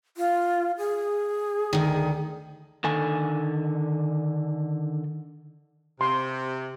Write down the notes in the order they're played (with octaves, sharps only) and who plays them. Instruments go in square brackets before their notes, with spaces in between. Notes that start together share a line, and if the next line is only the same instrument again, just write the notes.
[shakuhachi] F4
G#4
[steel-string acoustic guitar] D2 D#3
[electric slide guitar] D3 D#3 A4 G#5
[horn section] C3 [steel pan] C6